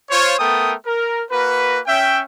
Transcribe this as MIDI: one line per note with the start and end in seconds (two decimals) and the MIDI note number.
0.10 0.34 65
0.10 0.34 72
0.10 0.34 73
0.39 0.73 57
0.39 0.73 59
0.39 0.73 69
0.39 0.73 70
0.39 0.73 79
0.39 0.73 87
0.86 1.22 70
1.31 1.79 58
1.31 1.79 66
1.31 1.79 70
1.31 1.79 71
1.87 2.21 61
1.87 2.21 76
1.87 2.21 79